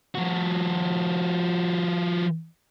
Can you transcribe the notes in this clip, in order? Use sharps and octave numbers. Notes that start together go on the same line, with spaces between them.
F3 F#4